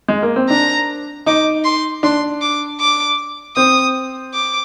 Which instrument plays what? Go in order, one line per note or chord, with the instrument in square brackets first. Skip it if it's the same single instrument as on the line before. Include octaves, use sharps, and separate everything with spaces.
[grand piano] G#3
A#3
C4
[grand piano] D4 [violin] A#5
[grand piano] D#4 [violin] D6
[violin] C6
[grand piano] D4 [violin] C6
[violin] D6
D6
[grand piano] C4 [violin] D#6
[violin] D6